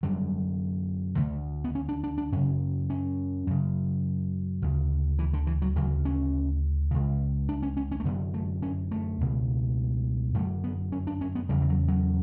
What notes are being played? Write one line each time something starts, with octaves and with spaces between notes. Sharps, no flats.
F#2 D3 G3
D2 D3 A3
B3
C#4
D4
D4
D4
F#2 C#3 C#4
C#4
F#2 C#3
D2 C#3
E3
D3
E3
F#3
D2 C#3 F#3
C#4
C#2 C#3
D4
C#4
C#4
C#4
A3
F#2 D3 B3
A3
C#4
A3
C#2 B2
F#2 D3 A3
B3
C#4
D4
C#4
B3
E2 C#3 G3
E3
F#3
F#3